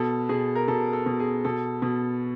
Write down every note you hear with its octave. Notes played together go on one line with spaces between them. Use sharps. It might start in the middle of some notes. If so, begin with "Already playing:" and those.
Already playing: B2 A4
B2 G#4
A#4
B2 A4
A4
B2
G#4
B2 A4
B2